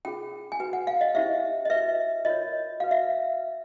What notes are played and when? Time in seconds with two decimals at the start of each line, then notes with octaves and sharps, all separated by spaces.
0.05 C#4 F4 G#4 G5
0.52 G#5
0.60 F#4 B4 G5
0.73 F#5
0.87 F5
1.01 D#5
1.15 C#4 E4 G4 C5 E5
1.65 D#5
1.70 F#4 B4 E5
2.25 F4 A#4 C#5 D#5
2.80 F#4 B4 F5
2.91 E5